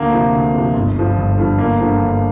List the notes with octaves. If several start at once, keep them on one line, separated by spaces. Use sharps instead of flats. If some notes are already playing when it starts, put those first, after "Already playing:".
Already playing: D2 A#3
C3 F3
D2
C3
F3
G1
G2 F3
G1
G2 F3
G1 A#3
G2 D3 F3
G1